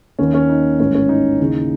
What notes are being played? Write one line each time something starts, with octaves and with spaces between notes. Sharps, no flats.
D#2 D#3 C#4
C#4
D#4
A1 G#2 D#3 C#4
C#4
D#4
D#2 C#3 E3